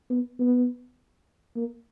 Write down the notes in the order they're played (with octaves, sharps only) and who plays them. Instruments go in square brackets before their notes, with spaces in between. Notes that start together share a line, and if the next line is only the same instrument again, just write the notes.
[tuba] B3
B3
A#3